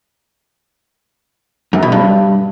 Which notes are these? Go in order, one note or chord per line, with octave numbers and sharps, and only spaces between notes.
F#2
B2
G2